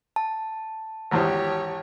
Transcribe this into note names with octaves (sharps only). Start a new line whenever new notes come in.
A5
G#1 E2 G4 C5 C#5